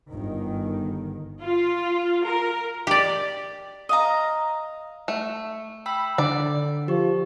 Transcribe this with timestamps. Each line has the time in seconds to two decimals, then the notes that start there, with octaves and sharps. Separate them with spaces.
0.12 G1 D#3
1.41 F4
2.23 A#4
2.87 G4 D5
3.89 D#5 F5 A#5
5.08 A3
5.86 G5 B5 E6
6.18 D3 D5
6.88 F3 G4 C#6